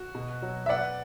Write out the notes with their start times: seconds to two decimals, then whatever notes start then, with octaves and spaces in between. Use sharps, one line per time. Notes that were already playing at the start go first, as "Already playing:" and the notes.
Already playing: F#4
0.15 B2
0.42 F#3
0.66 E5
0.69 B3 D5 F#5